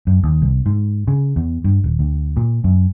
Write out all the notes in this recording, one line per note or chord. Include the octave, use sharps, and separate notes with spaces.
F#2
D#2
C2
G#2
C#3
E2
G2
D#1
D2
A#2
F#2